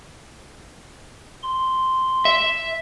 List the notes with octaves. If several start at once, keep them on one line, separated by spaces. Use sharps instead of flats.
C6
E5